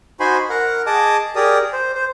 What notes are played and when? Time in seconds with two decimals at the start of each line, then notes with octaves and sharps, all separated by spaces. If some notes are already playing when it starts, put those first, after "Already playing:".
0.20 D#4 F#4 C5 G#5 B5 C6
0.50 A#4 F#5
0.86 G#4 D#5 A5 D6 D#6
1.36 G4 G#4 A#4 D5 D#6
1.73 C5
1.95 C5